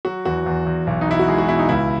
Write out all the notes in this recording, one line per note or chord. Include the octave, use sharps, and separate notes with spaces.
F#3 F#4
E2 F#4
E2
E2
B1
D#4
B2 E4
F#4
G#3 G#4
F#4
B2 E4
D#4
C#2 E4